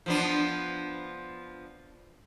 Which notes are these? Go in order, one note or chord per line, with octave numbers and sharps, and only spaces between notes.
F3 B3 D4